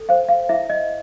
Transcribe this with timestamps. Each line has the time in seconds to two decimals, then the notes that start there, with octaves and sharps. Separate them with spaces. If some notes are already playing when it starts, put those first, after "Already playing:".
Already playing: A4
0.09 C5 F5
0.29 F5
0.49 E4 E5
0.70 D#5